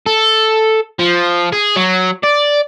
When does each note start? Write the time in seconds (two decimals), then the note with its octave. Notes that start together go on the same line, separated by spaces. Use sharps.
0.06 A4
0.99 F3
1.52 G#4
1.76 F#3
2.23 D5